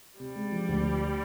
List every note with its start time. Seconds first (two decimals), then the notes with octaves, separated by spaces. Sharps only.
0.19 C3 G3
0.36 G#3
0.52 F3
0.68 D2